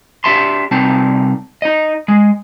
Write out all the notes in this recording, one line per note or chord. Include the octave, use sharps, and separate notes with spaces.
D4 G4 E5 A5 C6
C2 C4 D#4 A5
D#4 D#5
G#3